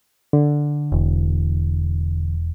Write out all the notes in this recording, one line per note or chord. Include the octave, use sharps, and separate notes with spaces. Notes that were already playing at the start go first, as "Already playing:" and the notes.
D3
E1